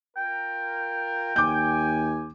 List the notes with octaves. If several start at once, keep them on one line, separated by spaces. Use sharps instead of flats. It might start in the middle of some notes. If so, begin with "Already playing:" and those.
F4 A#4 G5
D#2 G#5 D6 G6